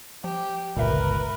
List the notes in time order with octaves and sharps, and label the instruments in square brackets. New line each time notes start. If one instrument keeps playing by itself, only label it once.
[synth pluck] F3 [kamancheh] G4
[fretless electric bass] G1 C#2 [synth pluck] A#2 E5 [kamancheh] A#4 B4